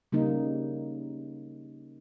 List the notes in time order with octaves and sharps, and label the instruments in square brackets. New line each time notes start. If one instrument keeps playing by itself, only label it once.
[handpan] C#3 G3 A#3 D#4